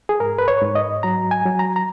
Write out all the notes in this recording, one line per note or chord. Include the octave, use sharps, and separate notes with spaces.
G#4
G#2 A#4
B4
C#5
G#2
D#5
F#3 A#5
G#5
F#3
A#5
A#5